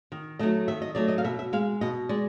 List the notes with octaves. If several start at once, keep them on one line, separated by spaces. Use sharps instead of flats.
D#3
F#3 A3 D#5
D#3 E5
D#5
F#3 A3 D5
D#5
F5
B2 E5
E5
G#3 F5
B2 D#5
G#3 D5